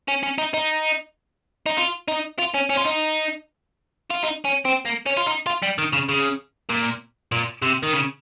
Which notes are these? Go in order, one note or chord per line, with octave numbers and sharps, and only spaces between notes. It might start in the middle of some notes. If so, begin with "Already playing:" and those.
C#4
C#4
D#4
D#4
D#4
F4
D#4
F4
C#4
C#4
F4
D#4
F4
D#4
C#4
C4
A#3
C#4
F4
D#4
F4
G3
D#3
C#3
C#3
A#2
A#2
C3
D#3
C#3